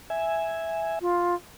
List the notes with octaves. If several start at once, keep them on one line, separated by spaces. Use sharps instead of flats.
E5 G#5
F4